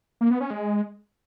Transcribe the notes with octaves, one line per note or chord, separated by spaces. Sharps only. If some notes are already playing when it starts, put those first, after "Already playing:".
A#3
B3
C#4
G#3